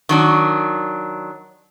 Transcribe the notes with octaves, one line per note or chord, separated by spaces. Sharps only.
D#3 F#3 D4